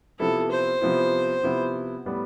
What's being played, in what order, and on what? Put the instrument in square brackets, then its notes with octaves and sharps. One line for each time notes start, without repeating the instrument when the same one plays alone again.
[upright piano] C3 F3 B3 E4 [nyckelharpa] A4
[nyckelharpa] C5
[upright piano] C3 F3 B3 E4
C3 F3 B3 E4
A2 G3 B3